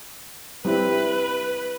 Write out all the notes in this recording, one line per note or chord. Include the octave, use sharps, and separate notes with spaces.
G3 C4 E4 B4